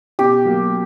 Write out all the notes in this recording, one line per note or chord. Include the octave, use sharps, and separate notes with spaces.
B2 G4
F#3 A#3